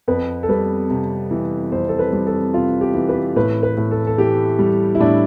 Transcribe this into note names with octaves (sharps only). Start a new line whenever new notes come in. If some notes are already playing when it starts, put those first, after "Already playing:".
F2 B4
A4
G3 B4
C3
E3
F2 C5
A4
B4
G3
A4
C3 F4
G4
E3
B4
A2 B4
B4
A2
A4
A4
E3 G4
G3
E4
A2 D4